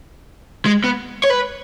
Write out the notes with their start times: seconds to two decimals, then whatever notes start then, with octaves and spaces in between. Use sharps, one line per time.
0.66 G#3
0.84 B3
1.24 C#5
1.30 B4